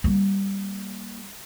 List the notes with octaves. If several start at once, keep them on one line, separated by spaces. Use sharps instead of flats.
G3 A#3